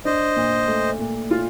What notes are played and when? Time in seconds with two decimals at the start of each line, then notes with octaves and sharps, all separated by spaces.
0.05 D4 C5 D#5
0.36 A#2
0.68 A3
0.99 A#2
1.31 F4